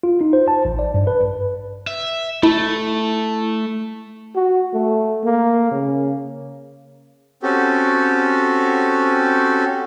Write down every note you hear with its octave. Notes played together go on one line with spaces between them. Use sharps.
F4
D#4
C5
A5
A1
D5
G2
B4
E5
A3 E4
F#4
A3
A#3
C#3
C4 C#4 F#4 G4 A4